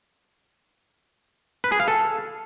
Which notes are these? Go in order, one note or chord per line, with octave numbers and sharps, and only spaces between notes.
B4
G#4
F5
A4